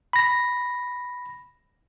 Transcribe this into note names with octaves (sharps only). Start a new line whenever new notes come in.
B5 A#6